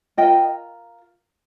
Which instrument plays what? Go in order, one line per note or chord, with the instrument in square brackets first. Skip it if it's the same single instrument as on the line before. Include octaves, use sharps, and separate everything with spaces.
[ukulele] F4 A#4 D#5 G5